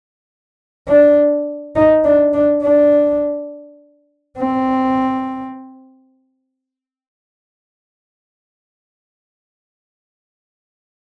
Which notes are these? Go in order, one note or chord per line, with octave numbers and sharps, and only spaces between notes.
D4
D#4
D4
D4
D4
C4